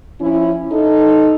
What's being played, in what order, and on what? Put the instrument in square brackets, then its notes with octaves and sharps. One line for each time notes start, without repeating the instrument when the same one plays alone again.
[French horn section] F3 C#4 E4
D#4 A4